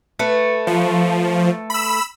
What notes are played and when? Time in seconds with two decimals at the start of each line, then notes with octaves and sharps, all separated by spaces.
0.19 A3 B4
0.67 F3
1.70 B5 E6